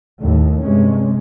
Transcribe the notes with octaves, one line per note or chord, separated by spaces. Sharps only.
D#2 A2
G2 C3 G#3 C#4